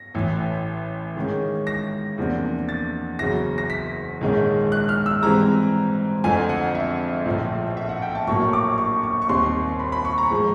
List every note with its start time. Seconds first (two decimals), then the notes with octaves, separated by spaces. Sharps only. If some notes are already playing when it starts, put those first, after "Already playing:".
Already playing: A#6
0.14 A1 A2 E3
1.16 G#2 D#3 G#3 C#4
1.67 A#6
2.18 E2 C3 F3 A#3 D4
2.69 A6
3.19 F#1 E2 C#3 F#3 A#6
3.58 A#6
3.70 B6
4.21 A#1 G#2 D#3 G#3 C#4
4.72 F#6
4.89 F6
5.06 E6
5.22 G#2 E3 G3 C4 A#5
6.24 F2 D3 F3 A3 C4 G#5
6.49 F#5
6.75 E5
7.25 A#1 A2 F3
7.77 E5
7.89 F#5
8.02 G5
8.15 A5
8.27 A#1 A2 F#3 A#3 C#4 C#6
8.53 D6
8.78 C#6
9.03 C#6
9.22 C#6
9.29 D#2 D#3 G3 C4 C6
9.79 B5
9.92 B5
10.05 C#6
10.18 A#5
10.30 A2 F3 G#3